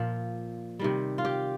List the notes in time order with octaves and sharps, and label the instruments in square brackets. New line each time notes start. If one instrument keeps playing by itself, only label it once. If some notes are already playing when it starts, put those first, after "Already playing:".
Already playing: [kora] A#2 F3
C3 D#3 G3
F4
G4